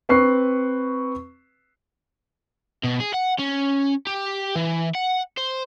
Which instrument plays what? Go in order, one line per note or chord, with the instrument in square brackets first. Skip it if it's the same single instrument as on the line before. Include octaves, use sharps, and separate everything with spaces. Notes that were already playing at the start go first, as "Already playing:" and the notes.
[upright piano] C4 B4 C#6 C7
[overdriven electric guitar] B2
G#4
F#5
C#4
G4
E3
F#5
C5